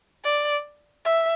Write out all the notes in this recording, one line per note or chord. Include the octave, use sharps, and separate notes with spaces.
D5
E5